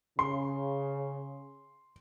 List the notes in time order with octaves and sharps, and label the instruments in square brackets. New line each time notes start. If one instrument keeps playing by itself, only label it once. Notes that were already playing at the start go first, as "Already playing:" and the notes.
[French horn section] C#3 [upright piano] C6